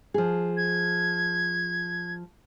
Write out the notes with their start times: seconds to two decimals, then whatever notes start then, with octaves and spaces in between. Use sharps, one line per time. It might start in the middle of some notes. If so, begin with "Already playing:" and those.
0.14 F3 G#4
0.57 G#6